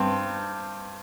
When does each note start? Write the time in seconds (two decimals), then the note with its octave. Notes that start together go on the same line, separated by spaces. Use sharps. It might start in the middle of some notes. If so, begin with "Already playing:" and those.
Already playing: G2 C4